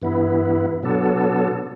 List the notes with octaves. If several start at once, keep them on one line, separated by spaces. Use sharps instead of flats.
G2 E3 B3 E4
B2 F#3 B3 D4 A4